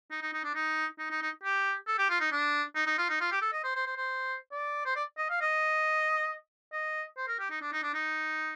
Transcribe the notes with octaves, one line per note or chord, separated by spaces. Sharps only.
D#4
D#4
D#4
D4
D#4
D#4
D#4
D#4
G4
A4
G4
F4
D#4
D4
D#4
D#4
F4
D#4
F4
G4
A4
D#5
C5
C5
C5
C5
D5
C5
D5
D#5
F5
D#5
D#5
C5
A#4
G4
D#4
D4
D#4
D4
D#4